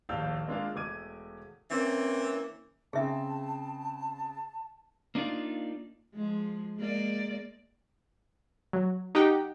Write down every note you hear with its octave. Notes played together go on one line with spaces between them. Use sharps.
D#1 A#1 A2 F5 E6 G6
G#3 A#3 D4 F4 A#4 F5
E1 A3 D#5 D6 G#6 D#7
E3 A#3 C4 C#4
C#3 C4 G#4 E5 A5
A#3 D4 D#4 F4 D5
F3 G#3
G#3 A#3 D5
F#3
D#4 G4 F#5 G5